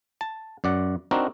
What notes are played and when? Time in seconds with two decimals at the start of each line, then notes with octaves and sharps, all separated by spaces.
0.21 A5
0.64 F#2 D5 F#5
1.11 C4 D4 D#4 F#4 A#4